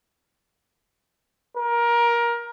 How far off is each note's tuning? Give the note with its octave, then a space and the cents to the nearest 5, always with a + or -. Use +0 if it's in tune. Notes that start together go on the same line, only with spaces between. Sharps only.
A#4 +20